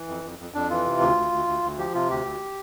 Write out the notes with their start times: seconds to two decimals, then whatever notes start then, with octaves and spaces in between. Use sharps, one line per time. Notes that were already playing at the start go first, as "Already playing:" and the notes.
Already playing: E3
0.08 F2
0.24 F2
0.39 F2
0.54 F2 D4
0.70 E3 F4
0.86 C3
1.00 D2
1.17 D2
1.32 D2
1.47 D2
1.63 D2
1.78 F3 G4
1.94 C3 F4
2.09 D2 G4
2.24 D2